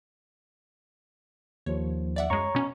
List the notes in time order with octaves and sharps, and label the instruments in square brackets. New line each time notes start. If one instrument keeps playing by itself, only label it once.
[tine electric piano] D#2 F3 [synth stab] C#5
[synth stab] D5 E5 F#5
[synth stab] F#2 G#3 [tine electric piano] C#5 A#5 C#6
[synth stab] B2 C#4